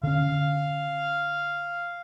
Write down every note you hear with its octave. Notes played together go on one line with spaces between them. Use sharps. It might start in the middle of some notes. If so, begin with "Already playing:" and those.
D3 C#4 F5